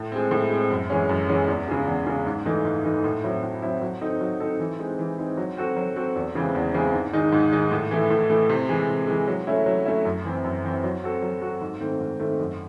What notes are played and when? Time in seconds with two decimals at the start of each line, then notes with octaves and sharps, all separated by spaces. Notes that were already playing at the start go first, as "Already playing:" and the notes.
Already playing: A2
0.12 G#3 C4
0.31 A2
0.50 G#3 C4
0.70 F#2
0.90 E3 G#3 C#4
1.09 F#2
1.29 E3 G#3 C#4
1.48 E2
1.68 C#3 G#3
1.87 E2
2.07 C#3 G#3
2.26 G#2
2.46 E3 A3 D#4
2.65 G#2
2.84 E3 A3 D#4
3.04 A2
3.23 F#3 C4 E4
3.43 A2
3.62 F#3 C4 E4
3.82 F#3
4.01 C4 D#4 A4
4.21 F#3
4.40 C4 D#4 A4
4.60 E3
4.79 G#3 C4 D#4
4.99 E3
5.18 G#3 C4 D#4
5.37 F#3
5.57 C4 F#4 A4
5.77 F#3
5.96 C4 F#4 A4
6.16 E2
6.35 C#3 E3 G#3 C4
6.55 E2
6.74 C#3 E3 G#3 C4
6.93 G#2
7.13 D#3 G#3 D#4
7.32 G#2
7.52 D#3 G#3 D#4
7.71 A2
7.91 E3 A3
8.10 A2
8.30 E3 A3
8.49 C3
8.69 E3 G#3
8.88 C3
9.07 E3 G#3
9.28 F#3
9.47 A3 C#4 E4
9.66 F#3
9.85 A3 C#4 E4
10.05 F#2
10.25 E3 C4
10.44 F#2
10.64 E3 C4
10.84 F#3
11.03 C4 F#4 A4
11.22 F#3
11.42 C4 F#4 A4
11.61 G#2
11.81 D#3 A3 C4
12.00 G#2
12.19 D#3 A3 C4
12.39 F#2